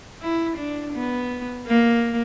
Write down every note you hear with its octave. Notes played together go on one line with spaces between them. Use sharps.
E4
D4
B3
A#3